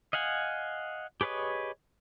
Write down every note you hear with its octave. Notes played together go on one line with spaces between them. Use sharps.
D#5 F5 F#5 G#5
G4 G#4 B4 C#5 D#5